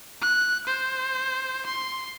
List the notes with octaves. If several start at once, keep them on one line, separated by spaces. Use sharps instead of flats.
F#6
C5
C6